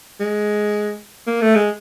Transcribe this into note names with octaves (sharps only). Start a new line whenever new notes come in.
G#3
A#3
A3
G#3